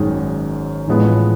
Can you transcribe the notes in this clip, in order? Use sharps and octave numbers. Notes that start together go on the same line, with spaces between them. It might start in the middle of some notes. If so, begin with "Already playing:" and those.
Already playing: G#1 F#2 D#3 G#3
A1 A2 F3 G#3 B3